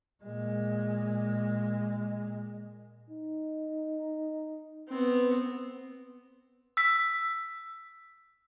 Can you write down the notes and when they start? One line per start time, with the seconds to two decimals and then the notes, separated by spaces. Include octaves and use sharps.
0.23 A#2 G#3
3.10 D#4
4.88 B3 C4
6.77 E6 B6